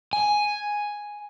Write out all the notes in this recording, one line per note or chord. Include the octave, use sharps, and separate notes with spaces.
G#5